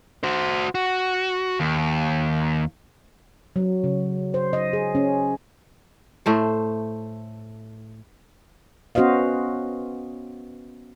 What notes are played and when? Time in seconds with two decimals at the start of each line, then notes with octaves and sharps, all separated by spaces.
0.23 F#4 C5
0.75 F#4
1.60 D#2
3.56 F#3
3.84 C#3
4.34 C5
4.53 D#5
4.73 G#4
4.95 C#4
6.26 A2 A3 C5
8.95 B3 C#4 F#4 C5 D#5 F5